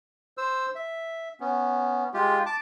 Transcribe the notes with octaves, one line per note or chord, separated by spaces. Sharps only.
C5 E6
E5
B3 C#4
G#3 F4 G4
A5 D6